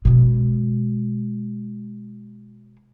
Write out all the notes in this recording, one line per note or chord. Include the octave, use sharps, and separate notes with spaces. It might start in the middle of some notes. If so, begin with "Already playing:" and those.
B2 G#3